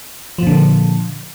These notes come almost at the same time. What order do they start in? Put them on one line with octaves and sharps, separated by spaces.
F3 A#2 D3